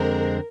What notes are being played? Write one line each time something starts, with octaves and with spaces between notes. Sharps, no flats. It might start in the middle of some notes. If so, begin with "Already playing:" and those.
Already playing: F2 D3 G#3 C4 A#4